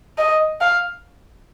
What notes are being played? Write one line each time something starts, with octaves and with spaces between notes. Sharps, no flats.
D#5
F5